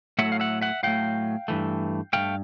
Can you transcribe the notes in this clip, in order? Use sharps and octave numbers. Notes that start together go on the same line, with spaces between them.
A2 F#3 A3 E5 F#5
F5
E5 F#5
E5 F#5
A2 F#3 A3 F5 G5
G2 E3 A3
G2 E3 A3 F5 G5